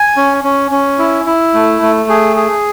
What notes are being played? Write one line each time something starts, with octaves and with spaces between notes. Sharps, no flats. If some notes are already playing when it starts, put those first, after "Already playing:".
Already playing: G#5
C#4
C#4
C#4
E4
E4
A3
A3
G#4
G#4